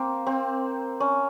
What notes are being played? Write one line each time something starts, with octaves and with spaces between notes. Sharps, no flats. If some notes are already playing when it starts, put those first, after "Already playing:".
Already playing: A#3 C4
C4
C#4